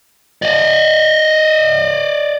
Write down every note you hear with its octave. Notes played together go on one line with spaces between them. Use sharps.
D5 D#5